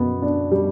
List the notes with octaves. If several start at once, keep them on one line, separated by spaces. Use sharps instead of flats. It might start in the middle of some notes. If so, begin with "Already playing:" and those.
Already playing: F#2 B2 B3
D4
G3